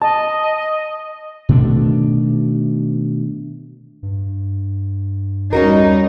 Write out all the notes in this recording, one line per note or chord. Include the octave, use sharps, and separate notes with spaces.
D#5 A5
B2 D#3 A3 D4
G2
E2 G3 C#4 D#4 F#4 A#4